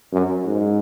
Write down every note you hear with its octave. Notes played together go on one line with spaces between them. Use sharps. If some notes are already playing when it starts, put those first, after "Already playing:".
F#2
G#2